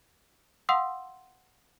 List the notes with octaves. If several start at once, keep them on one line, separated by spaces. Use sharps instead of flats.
F5 F#5 C6 D#6 E6